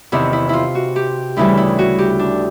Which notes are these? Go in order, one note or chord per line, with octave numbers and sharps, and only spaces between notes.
E2 C3 D#3 E4
E4
E4 F4
F#4
G4
D2 C#3 E3 G3 E4
E4
F#4
G4
D4